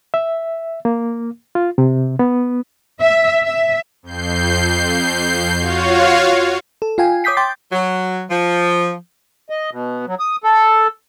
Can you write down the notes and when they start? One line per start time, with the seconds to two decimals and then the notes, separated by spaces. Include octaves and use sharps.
0.14 E5
0.85 A#3
1.55 F4
1.78 C3
2.19 B3
3.01 E5
3.44 E5
4.03 F2 G6 C7
5.59 F4 F#4 C#5 F5
6.82 A4
6.98 F4 F5 G5 G#5
7.24 C#5 D6 D#6 G6 B6 C7
7.37 G5 C6 D6 G6 A6
7.72 F#3
8.30 F3
9.50 D#5
9.71 B2
10.07 F#3
10.19 D#6
10.44 A4